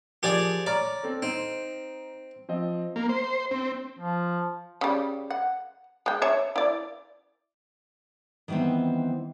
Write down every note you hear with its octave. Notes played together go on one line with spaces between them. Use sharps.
F3 F4 G4 G#4 A#4 D5
C#5 D5 A#5 F6
C4 A4
C4 D#4
F3 C4 D#5
A#3
C5
C4
F3
C#3 G3
F#5
G#3 G5
C#5 E5
E4 D5
D#3 E3 G3 B3 C4